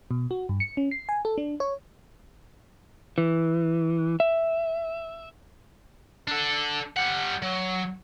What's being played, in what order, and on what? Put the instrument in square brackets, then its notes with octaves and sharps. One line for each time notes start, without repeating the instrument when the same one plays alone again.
[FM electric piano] B2
F#4
G2
C#7
C#4
C7
G#5
A4
D4
C#5
[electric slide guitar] E3
E5
[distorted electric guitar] D4 A4
G3 F#5
F#3